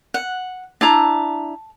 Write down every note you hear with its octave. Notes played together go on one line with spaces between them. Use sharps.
F#5
D4 E4 A5 A#5